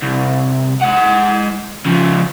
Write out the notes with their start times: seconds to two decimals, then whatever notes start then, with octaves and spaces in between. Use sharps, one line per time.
0.02 C2
0.81 G#3 F#5
1.86 C#3 F3